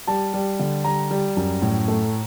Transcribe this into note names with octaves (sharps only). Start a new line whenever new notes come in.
G3 A5
G3
D3
G3 A#5
G3
F#2
A2
A3